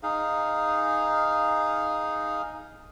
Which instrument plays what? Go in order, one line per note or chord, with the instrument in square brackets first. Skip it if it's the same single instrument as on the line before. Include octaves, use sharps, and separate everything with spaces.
[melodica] D#4 G#4 F5